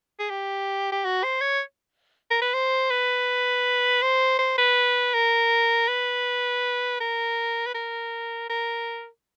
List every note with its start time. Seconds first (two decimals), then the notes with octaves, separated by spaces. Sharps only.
0.19 G#4
0.30 G4
0.92 G4
1.05 F#4
1.23 C5
1.41 C#5
2.31 A#4
2.42 B4
2.54 C5
2.90 B4
4.02 C5
4.39 C5
4.58 B4
5.14 A#4
5.88 B4
7.00 A#4
7.66 B4
7.74 A#4
8.49 A#4